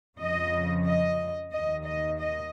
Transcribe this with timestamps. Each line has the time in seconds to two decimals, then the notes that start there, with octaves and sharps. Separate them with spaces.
0.19 F2 C#3 F3 D#5
0.85 D#5
1.52 D#2 D#3 D#5
1.86 D#5
2.19 D#5